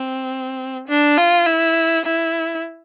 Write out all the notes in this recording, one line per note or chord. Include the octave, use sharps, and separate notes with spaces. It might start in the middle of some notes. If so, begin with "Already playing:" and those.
Already playing: C4
D4
F4
E4
E4